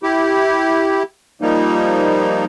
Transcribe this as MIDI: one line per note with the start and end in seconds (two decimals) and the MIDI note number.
0.03 1.03 64
0.03 1.03 67
1.42 2.45 53
1.42 2.45 55
1.42 2.45 58
1.42 2.45 63